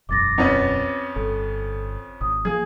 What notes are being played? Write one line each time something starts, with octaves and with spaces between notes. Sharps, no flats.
E1 B1 F#2 D6 A6 A#6
F2 B3 C#4
G1 A4
G#1 D#6
F3 A3 A#3 G#4 G#6